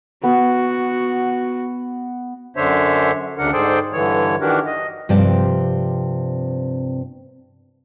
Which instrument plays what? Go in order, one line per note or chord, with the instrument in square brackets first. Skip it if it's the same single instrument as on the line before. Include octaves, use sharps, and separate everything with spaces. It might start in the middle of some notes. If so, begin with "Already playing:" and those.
[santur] B3 [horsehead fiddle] F#4
[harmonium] F#2 D3 D4 C5 C#5 E5
D2 C#3 D4 A#4 F#5
G#2 G#4 A4 C5 D5 G5
G2 D3 E3 C#5
D#3 E3 D4 F#4 G4 A#4
D#5
[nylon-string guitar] G2 C3 F3 C4 C5 D5